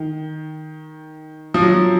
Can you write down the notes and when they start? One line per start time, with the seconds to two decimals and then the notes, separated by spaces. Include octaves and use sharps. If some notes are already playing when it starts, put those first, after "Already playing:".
Already playing: D#3
1.54 F3
1.62 F#3
1.69 F3